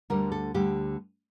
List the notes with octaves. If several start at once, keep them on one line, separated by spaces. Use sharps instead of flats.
D2 D3 G3 A#4
A4
D2 D3 G3 G4